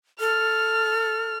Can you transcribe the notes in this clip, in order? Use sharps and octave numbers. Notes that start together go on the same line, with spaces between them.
A4 F6